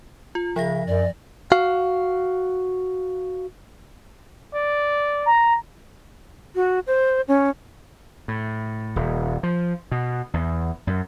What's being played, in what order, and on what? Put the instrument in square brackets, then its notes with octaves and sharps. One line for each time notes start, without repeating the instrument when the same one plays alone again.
[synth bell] F4
[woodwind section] C#3 [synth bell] F3 A#6 [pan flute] E5
[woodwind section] F#2 [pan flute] D5
[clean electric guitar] F#4 F5
[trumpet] D5
[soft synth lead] A#5
[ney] F#4
C5
C#4
[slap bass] A2
D#1
F3
B2
E2
F#2